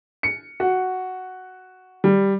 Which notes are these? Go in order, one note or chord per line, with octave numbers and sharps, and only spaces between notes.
C#7
F#4
G3